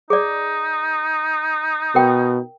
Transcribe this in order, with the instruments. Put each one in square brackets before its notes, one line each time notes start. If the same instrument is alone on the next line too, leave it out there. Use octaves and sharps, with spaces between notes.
[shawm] D#4 [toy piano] G#4 D5
[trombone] B2 [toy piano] A#4 G5